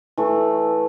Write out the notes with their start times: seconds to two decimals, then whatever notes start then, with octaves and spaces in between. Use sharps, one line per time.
0.18 E3 A3